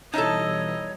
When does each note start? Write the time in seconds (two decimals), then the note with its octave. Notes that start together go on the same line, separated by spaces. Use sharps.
0.14 B2 E3 G3 D#4 E4 A4 C#5 D#5